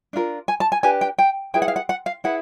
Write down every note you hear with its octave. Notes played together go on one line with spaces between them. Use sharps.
D4 F4 A#4
G#5
A5
G#5
D4 G4 B4 G#5
G5
G5
E4 G#4 B4 G5
F#5
F5
F#5
F#5
F5
E4 G#4 B4 F#5